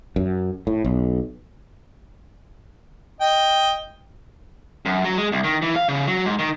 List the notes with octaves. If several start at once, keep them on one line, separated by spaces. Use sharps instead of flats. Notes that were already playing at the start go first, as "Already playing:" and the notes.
F#2
A2
B1
D#5 G5
F#2
F#3
G#3
C2
D#3
E3
F5
C#3
F#3
G#2
D#3